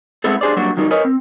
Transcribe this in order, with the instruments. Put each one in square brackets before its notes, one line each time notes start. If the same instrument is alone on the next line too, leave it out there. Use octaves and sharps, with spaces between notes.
[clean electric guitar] G#3 B3 C4 E4 A4
D4 G4 G#4 C5 D5
F#3 G3 A#3 D4 F#4
D#3 F#3 G3 D#4 G4 A#4
A#4 B4 C#5 D#5 G#5 B5
C4